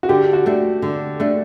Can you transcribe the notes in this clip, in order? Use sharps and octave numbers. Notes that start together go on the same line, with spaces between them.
F#4
D3 G4
F#4
A3 D4
D3
A3 D4